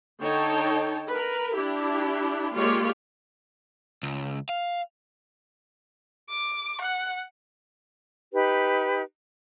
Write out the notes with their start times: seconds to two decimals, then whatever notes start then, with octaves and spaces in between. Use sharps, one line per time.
0.21 D3 D#4 A4 C#5 G5 A5
1.09 A#4 B4
1.55 D4 E4 G4
2.54 G#3 A#3 F4 G4 C#5 D5
4.03 C#2
4.49 F5
6.29 D6
6.81 F#5
8.33 D#4 G4 B4